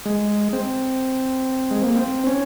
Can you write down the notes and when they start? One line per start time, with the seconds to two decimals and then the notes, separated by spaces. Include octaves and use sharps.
0.06 G#3
0.53 C4
1.71 G#3
1.83 A#3
1.95 C4
2.27 C#4